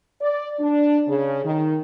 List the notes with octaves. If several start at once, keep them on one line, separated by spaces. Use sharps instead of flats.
D5
D4
C#3
D#3